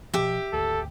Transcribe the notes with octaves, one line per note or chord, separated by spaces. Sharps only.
B2 F3 G4 E5
G#1 D2 A4